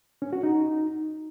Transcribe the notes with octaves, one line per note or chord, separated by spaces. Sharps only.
C#4
F#4
D#4